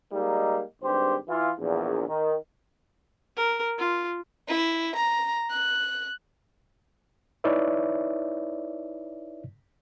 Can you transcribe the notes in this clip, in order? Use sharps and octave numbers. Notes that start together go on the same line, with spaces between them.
G3 G#3 A#3 D#4
G#1 G2 G4 C5
E3 E4 F4
A#1 E2
D#3
A#4
F4
E4
A#5
F#6
D#4 E4 B4 C#5 D5 E5